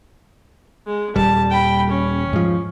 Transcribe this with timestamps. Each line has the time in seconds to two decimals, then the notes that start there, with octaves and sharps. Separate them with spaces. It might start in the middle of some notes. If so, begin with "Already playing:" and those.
0.86 G#3
1.16 D#1 G3 A5
1.51 G5 B5
1.89 C#4
2.33 G#2 F3